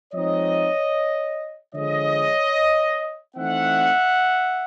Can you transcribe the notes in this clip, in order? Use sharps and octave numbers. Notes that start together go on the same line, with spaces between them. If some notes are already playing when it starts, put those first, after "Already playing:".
F3 G#3 C4 D#4 C#5 D#5
D3 F3 G#3 C#5 D#5
E3 A3 C4 D#4 E5 F#5